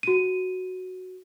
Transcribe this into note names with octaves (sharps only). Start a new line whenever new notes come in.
F#4 D#7